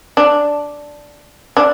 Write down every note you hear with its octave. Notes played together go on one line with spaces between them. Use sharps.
D4
D4